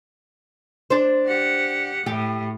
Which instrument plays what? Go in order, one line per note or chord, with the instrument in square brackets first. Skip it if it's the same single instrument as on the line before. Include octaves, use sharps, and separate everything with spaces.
[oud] D4 C5
[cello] G4 F#5
[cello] A2 [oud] G4